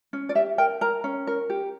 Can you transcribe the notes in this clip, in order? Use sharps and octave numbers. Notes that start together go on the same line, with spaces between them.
C#4
D5
G4 E5
A#4 G5
A#4 A#5
C#4
A#4
G4